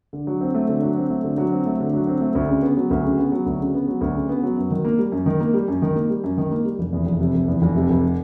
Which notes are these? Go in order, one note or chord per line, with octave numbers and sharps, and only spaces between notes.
D3
F#3
C4
A3
D3
F#3
C4
A3
D3
F#3
C4
A3
D3
F#3
C4
A3
D2
C#3
B3
F#3
D2
C#3
B3
F#3
D2
C#3
B3
F#3
D2
C#3
B3
F#3
F#2
D#3
A#3
G3
F#2
D#3
A#3
G3
F#2
D#3
A#3
G3
F#2
D#3
A#3
G3
F1
E2
F1
C3
F1
E2
F1
C3
F1